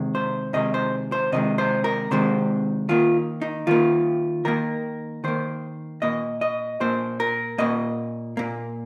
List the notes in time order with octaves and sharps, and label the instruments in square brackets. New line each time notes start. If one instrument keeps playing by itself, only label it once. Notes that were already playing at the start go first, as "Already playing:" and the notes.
Already playing: [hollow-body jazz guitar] C3 D#3 G#3
C5
C3 D#3 G#3 D#5
C5
C5
C3 D#3 G#3 D#5
C5
A#4
C3 D#3 G#3 C5
D#3 A#3 F4
D#4
D#3 A#3 F4
D#3 A#3 A#4
D#3 A#3 C5
A#2 A#3 D#5
D#5
A#2 A#3 C5
A#4
A#2 A#3 D#5
A#2 A#3